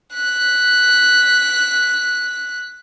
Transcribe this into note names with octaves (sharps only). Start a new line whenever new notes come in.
F#6 B6